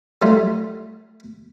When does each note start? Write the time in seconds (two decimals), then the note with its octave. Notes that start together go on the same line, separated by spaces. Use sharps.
0.22 F#3 G3 A3 D#4 F4